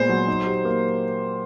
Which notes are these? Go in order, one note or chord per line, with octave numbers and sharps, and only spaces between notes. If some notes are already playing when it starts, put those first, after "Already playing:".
Already playing: A#2 G#3 B3 C5
F#3
D#4
G4
A#3